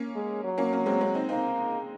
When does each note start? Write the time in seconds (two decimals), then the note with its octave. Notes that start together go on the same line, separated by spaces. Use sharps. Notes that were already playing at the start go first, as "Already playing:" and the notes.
Already playing: A#3 C#4
0.15 G#3
0.44 F#3
0.58 A#3 C#4
0.73 A#3 C#4
0.86 G#3 C4
1.01 G#3 C4
1.14 C4 D#4
1.29 A#3 C4 D#4